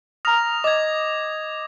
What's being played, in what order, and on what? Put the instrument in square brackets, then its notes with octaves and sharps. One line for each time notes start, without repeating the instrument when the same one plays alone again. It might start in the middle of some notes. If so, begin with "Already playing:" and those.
[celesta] A#5 F6 [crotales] D#6 A#6 F7
[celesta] D#5 [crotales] D6 G#6